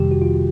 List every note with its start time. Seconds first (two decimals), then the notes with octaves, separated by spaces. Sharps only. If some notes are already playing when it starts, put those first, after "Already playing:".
Already playing: F2 C3 D#3 G3 G4
0.11 F#4
0.22 F4